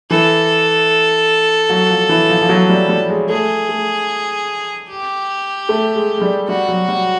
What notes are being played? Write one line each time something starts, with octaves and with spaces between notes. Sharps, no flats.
E3 A4
F#3
F3
E3
F3
F3
F#3
G3
G3
G#3
A3 G#4
A3
G4
A3
G#3
G#3
G3
G3 F#4
F#3
G3